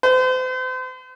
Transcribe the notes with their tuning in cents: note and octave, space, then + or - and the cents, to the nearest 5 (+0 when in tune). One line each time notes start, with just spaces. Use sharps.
C5 -40